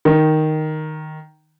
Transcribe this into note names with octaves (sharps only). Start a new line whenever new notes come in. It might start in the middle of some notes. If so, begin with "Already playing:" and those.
D#3